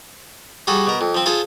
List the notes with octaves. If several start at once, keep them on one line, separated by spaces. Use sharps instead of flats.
G3 F#4 G#4 A4
B2 A#4
F2
F3 C4
F4 G#4 A4 C5